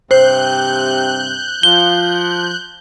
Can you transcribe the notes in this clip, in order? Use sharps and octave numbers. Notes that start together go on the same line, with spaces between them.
G2 C3 C5 F#6 G6
F3 G7